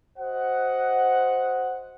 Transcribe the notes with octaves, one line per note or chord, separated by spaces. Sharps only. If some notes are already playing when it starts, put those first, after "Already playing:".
F#4 C5 D#5 F#5